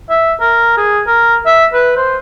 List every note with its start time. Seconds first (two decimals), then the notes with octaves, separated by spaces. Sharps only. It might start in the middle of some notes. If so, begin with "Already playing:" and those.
0.09 E5
0.40 A#4
0.77 G#4
1.07 A#4
1.46 E5
1.73 B4
1.96 C5